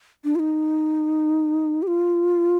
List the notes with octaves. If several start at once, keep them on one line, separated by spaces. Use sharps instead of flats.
D4
F4
D#4
G4
F4